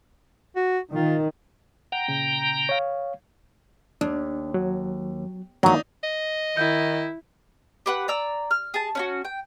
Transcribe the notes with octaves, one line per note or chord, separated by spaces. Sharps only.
F#4
D#3 F4
F#5 G5 A#5
A#2 C#3
C#5 F5
D#2 D4
F#3
D#3 F#3 A#3 D4 D#4
D#5
D#3 E4 G6
G4 B4 F#5
D5 A#5 E6
F6
G#4 A5
C#4 E4 F#4
G5